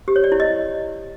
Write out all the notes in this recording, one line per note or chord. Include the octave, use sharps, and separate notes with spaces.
G4
C#5
D5
E4
D#5